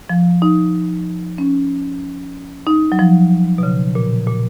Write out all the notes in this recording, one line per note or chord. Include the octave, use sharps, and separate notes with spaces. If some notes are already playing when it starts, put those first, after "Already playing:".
F3
D#4
C#4
D#4
F#3
F3
B2
C#3
A#2
A#2